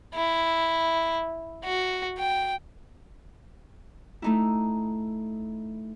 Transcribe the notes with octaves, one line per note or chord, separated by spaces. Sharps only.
E4
F#4
G5
A3 D#4 E4